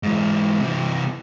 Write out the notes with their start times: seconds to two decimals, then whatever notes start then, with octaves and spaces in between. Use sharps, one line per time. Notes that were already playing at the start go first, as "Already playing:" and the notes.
0.03 G#2 E3
0.60 C3 E3